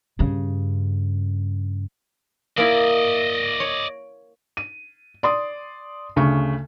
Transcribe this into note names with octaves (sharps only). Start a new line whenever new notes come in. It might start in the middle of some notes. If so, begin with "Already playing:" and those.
G2 C#3
A#3 E4 D5 D#5
C#5
D#7
D5 C6 D#6
D2 C#3 D4 C#6